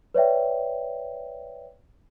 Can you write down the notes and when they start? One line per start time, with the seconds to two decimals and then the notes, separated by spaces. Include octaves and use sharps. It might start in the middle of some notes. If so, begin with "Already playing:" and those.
0.14 B4 C#5 D5 E5 G5